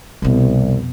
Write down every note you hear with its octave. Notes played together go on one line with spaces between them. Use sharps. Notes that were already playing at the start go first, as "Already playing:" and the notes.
C2 F2 B2